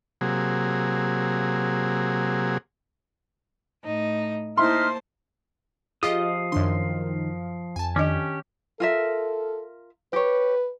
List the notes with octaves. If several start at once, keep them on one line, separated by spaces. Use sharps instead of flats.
C3 F#3 A#3 G#4
A2 D#4
A#3 D#4 E4 C5 E5 A5 C6 F6
F3 F4 G4 G#4 D#5 F5 D#6
F#2 D#3 D4 C6
F2 G#5 A5
D#3 C#4 D4 G4 D#5
F4 A4 A#4 E5
G4 B4 C#5